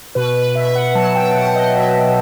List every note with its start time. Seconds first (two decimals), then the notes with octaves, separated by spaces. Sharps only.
0.15 B2 B4
0.35 B4
0.55 B2 E5
0.67 E5
0.75 F#5
0.95 F#3 A5
1.15 G5
1.35 B2 F#5
1.55 D#5
1.75 F#3 E5